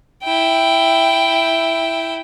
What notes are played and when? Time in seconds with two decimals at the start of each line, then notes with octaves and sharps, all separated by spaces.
0.24 E4 G5